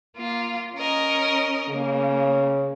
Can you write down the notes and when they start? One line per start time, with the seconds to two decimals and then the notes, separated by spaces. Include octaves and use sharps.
0.15 A#3 F4
0.75 C#4 A#4 D#5
1.69 C#3 A#3